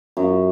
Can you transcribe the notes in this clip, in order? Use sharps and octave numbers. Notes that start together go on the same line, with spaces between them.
F#2